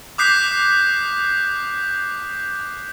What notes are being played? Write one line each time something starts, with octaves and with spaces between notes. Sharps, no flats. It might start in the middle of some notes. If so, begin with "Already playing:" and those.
D6 D#6 F#6 G6 B6 C7